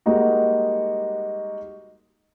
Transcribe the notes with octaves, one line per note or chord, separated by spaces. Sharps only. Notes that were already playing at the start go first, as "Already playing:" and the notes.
G3 G#3 A#3 D#4 F#4